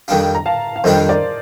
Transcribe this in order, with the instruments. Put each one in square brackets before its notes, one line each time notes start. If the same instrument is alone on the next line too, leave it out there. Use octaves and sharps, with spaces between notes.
[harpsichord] F2 D#3 G3 D4 F4
[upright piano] A#5
F5 A5
F5
[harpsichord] F2 D#3 G3 D4 F4 [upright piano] C5 D#5
[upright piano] A#4 D5